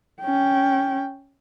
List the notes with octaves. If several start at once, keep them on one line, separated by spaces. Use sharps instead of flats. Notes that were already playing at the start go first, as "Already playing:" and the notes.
C#4 G5